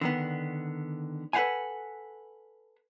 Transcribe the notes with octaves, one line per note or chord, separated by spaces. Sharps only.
D3 D#3 B3
A4 B4 C5 F5 F#5 G#5